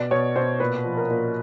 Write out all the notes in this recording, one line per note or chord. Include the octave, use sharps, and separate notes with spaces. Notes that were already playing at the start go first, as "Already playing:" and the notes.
Already playing: B2 D5
B2 C#5
B2 C5
A#2 B4
F3
A#4
A#2